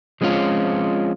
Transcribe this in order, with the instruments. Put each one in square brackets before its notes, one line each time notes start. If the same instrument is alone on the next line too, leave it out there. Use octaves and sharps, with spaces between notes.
[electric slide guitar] F3 G#3 C4 C#4 F4